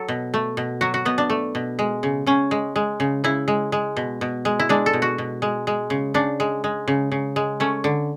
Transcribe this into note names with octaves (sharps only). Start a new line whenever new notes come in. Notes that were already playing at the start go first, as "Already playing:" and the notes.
Already playing: F#3 A4
B2
A3
B2
F#3 F#4
F#4
B2 B3
D4
A3
B2
G#3
C#3
C#3 C#4
G#3
G#3
C#3
C#3 E4
G#3
G#3
B2
B2
G#3
E4
G#3 D4
A4
B2
F#4
B2
G#3
G#3
C#3
C#3 D4
G#3
G#3
C#3
C#3
G#3
A3 C#4
D3